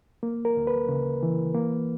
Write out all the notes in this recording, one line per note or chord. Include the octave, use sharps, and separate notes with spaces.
A#3
A#4
D2
B4
C#3
E3
A#3